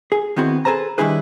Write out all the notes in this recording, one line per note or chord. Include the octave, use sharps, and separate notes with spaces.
G#4
D#3 B3 C4 E4 F#4
G#4 A4 B4 C5 A#5
D#3 G3 D4 E4 G#4 B4